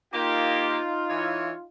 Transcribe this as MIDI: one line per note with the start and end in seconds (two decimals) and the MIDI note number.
0.13 0.77 58
0.13 1.65 63
0.13 1.65 65
0.13 0.77 67
1.10 1.51 52
1.10 1.51 73